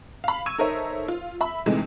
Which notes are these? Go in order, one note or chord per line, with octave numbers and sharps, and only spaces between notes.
F5 B5
C#6 E6 G#6 D#7
D#4 A4 A#4 C5 C#5 E5
F4
E5 B5
C3 E3 G#3 A3 D#4